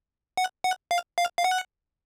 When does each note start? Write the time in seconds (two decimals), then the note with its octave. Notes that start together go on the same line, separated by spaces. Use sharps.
0.37 F#5
0.64 F#5
0.91 F5
1.18 F5
1.38 F5
1.44 F#5